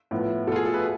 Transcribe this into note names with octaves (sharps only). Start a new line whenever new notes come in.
A2 F3 B3
B2 A3 E4 F4 A4
G#4
A4
B4